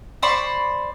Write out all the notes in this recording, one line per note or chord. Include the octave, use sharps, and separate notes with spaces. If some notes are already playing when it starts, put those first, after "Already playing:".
C5 D5 B5 C#6